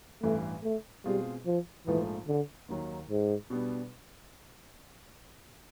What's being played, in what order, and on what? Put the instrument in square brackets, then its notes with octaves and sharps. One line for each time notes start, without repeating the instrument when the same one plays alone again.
[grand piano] A1 G2 E3 [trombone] A3
[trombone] A3
[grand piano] B2 G#3 C4 F4 G#4 [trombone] G3
[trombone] F3
[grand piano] A#1 G#2 F3 A3 [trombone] E3
[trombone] D3
[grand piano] D#2 D#3 F#3
[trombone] G#2
[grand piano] B2 G3 B3 D4